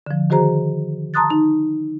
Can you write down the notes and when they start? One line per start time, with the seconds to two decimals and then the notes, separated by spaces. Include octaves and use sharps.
0.06 D3 F3
0.30 D#3 F#4 G#4 C5 A#5
1.14 A5 A#5 C6 D#6 F#6 A6
1.30 D#4